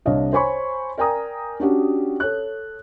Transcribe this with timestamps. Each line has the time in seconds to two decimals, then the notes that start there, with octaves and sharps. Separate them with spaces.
0.05 C2 C3 D4 C#5 D#5 F5
0.33 C5 C#5 G#5 B5 C#6
0.97 A#4 D5 G5 G#5 A#5 D#6
1.60 C#4 D4 F#4 G4
2.20 A4 C#5 F#6